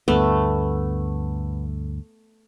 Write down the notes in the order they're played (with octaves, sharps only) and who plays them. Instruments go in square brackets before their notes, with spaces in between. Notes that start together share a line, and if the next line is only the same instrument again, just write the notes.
[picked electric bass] D2 G2 [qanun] A3 [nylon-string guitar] B3